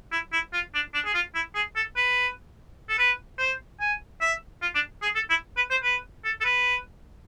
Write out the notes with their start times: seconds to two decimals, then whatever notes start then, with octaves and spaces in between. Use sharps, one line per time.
0.12 E4
0.33 E4
0.53 F4
0.74 D4
0.94 D4
1.06 G#4
1.15 F4
1.35 E4
1.55 G#4
1.76 A4
1.97 B4
2.89 A4
2.99 B4
3.39 C5
3.80 G#5
4.21 E5
4.62 F4
4.75 D4
5.02 G#4
5.15 A4
5.30 E4
5.57 B4
5.71 C5
5.84 B4
6.25 A4
6.41 A4
6.45 B4